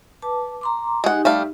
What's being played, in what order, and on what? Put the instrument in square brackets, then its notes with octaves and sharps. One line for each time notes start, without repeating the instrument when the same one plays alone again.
[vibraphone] B4 A5 D6
A#5 C6 D6
[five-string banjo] G#3 F#5 [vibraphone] D#4 G4
[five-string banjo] G3 A3 F5